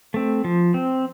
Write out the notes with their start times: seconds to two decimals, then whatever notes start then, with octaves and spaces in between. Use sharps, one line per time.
0.14 A3 C4
0.44 F3
0.74 C4